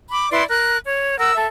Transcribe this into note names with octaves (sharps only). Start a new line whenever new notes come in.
B5 D6
E4 B4 D5 C6
A#4 F#6
C#5
A#4 F#5 E6
A4 E5